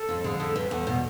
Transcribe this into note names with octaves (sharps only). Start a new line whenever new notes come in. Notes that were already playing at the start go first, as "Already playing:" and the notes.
Already playing: A4
F2
D3 G#4
F2 A4
F2 B4
E2 A4
B2